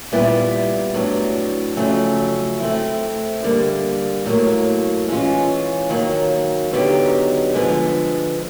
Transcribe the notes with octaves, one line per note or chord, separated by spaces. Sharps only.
A#2 G3 B3 E4 G4
A2 F#3 B3 D4
F2 C#3 F#3 A3
A3 C4 E4
D3 G3 A#3
A2 F#3 A#3
E3 G#3 C#4 F4
D#3 F#3 A#3
D3 F#3 B3 D#4 G4
D3 F3 G#3 B3